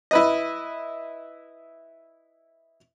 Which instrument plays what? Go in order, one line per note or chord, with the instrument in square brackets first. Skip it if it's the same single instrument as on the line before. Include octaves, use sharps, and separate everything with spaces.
[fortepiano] E4 B4 D#5